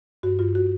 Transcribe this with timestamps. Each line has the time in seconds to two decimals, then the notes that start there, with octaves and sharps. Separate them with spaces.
0.23 G2 F#4
0.39 G2 F4
0.55 F#4